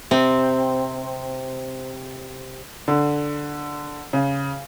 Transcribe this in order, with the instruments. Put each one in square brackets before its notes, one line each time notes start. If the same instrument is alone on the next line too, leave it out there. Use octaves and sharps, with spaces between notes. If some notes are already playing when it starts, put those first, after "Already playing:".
[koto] C3 C4
[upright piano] D3
C#3